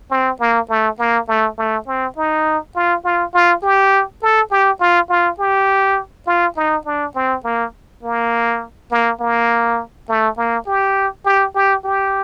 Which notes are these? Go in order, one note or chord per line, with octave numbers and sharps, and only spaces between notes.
C4
A#3
A3
A#3
A3
A3
C4
D#4
F4
F4
F4
G4
A4
G4
F4
F4
G4
F4
D#4
D4
C4
A#3
A#3
A#3
A#3
A3
A#3
G4
G4
G4
G4